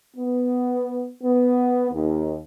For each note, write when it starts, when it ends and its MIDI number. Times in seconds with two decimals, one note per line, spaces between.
0.16 1.12 59
1.23 1.91 59
1.92 2.37 39